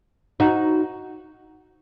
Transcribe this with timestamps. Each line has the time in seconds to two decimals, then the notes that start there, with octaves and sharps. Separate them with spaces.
0.40 D#4 F#4